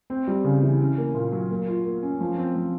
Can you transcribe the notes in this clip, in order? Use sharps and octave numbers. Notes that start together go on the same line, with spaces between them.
C4
G3
C#3
E3
C#4
A#3
A#2
F#3
A#3
F4
A#3
C#4
F3
C4
F3